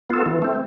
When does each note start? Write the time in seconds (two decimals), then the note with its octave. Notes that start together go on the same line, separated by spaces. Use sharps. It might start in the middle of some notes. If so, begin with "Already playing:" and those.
0.10 B3 F4 A4
0.26 E3
0.42 A3 C4